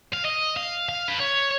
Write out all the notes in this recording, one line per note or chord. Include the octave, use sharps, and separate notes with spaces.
F5
D#5
F5
F5
B4
C#5